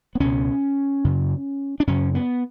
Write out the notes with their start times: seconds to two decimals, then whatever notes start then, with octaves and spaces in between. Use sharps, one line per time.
0.15 B3
0.20 C#2 B2 C#4
1.04 F#2 C#3
1.80 D4
1.87 F#2 C#3 C#4
2.15 B3